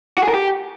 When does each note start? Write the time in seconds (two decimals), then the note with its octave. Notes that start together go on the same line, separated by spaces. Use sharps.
0.18 F#4
0.23 G#4
0.29 A#4
0.34 G4